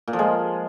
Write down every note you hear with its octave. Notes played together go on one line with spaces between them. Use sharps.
A#2
F3
G#3